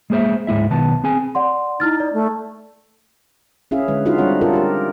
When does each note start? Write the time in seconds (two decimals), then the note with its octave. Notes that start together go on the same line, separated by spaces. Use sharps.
0.10 G#3 A#3 G#4 C5 E5
0.47 D2 G#2 G#3 E4 E5
0.70 B1 D#3 B3 A5
1.04 C4 G#4 G#5
1.35 D5 F#5 C6
1.80 D#4 E4 F6 A6
2.00 D5
2.13 A3
3.71 C#4 E4 G#4 E5 F5
3.88 D3 G#3 B4
4.05 D#4 F4 F#4 G#4 E5 F5
4.18 G3 C4 D4 C#5 F#5
4.41 F4 A4 A#4
4.53 G4 A#4